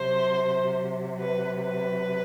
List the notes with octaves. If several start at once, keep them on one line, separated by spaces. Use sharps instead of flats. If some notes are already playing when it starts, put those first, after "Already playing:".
Already playing: C3 F#3 C5
B4
B4